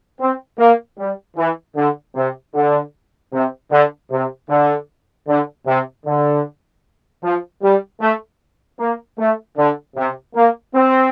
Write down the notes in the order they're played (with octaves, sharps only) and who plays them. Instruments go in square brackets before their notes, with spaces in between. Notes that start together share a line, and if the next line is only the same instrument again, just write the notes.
[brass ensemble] C4
A#3
G3
E3
D3
C3
D3
C3
D3
C3
D3
D3
C3
D3
F3
G3
A3
A#3
A3
D3
C3
A#3
C4